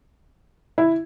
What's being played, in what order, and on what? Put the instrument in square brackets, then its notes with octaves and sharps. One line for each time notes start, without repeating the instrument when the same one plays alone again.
[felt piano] E4